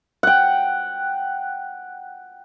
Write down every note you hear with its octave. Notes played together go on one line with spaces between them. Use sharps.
F#5 G5